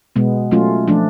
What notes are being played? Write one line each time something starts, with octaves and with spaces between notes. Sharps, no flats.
B2 G#3 B3
F#3 A3 C#4 F4
F3 A3 D4